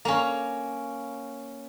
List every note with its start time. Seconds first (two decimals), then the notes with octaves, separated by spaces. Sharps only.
0.05 A#3 C#4